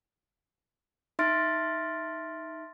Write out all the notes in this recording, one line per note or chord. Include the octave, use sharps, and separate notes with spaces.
D#4 E5 C6 F6 A6 D7